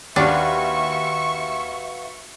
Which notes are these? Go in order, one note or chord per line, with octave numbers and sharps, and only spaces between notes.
D#2 D4 F#4 B4 E5 F5 C#6